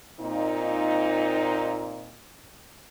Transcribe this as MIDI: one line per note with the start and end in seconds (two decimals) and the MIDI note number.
0.20 2.16 46
0.20 2.16 60
0.20 2.16 63